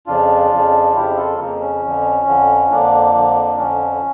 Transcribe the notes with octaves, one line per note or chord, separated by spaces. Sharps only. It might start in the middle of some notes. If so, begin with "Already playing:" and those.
F2 C#3 F3 D4 F4
F2 C#3 F3
F2 C#3 F3 E4 G4
F4 A4
F2 C#3 F3 A#3
C#4
F2 D3 F3
F2 D3 F3
F2 D3 F3 A#3 D4
F2 D3 F3
F2 D3 F3 C#4